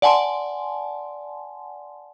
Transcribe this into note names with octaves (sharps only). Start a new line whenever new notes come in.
D5 F#5 G#5 A5 C6